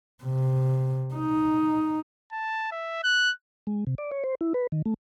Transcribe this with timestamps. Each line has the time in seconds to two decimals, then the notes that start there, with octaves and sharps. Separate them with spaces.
0.24 C3
1.14 D#4
2.32 A5
2.72 E5
3.04 F#6
3.67 G#3
3.87 C3
3.98 D5
4.11 C#5
4.24 C5
4.41 E4
4.54 B4
4.72 D#3
4.86 A3